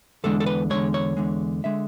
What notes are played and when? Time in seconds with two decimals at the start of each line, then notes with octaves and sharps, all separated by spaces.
0.24 E2 D3 G#3 A4
0.40 A4
0.46 B4
0.70 E2 D3 G#3 C#5
0.94 C#5
1.17 E2 D3 G#3
1.64 D3 G#3 E5